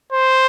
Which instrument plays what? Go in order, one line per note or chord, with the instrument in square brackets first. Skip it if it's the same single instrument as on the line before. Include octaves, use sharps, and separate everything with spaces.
[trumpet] C5